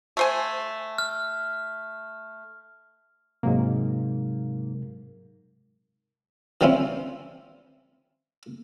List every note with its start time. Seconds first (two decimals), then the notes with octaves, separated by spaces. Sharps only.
0.17 A3 C5 G#5
0.98 F6
3.43 G#2 C3 F#3 G#3 A#3
6.61 E3 G3 C4 C#4 E4 F4